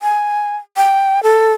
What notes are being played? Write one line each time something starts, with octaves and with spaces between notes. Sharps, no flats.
G#5
G5
A4